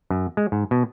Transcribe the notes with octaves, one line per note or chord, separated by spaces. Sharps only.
F#2
G#3
G#2
B2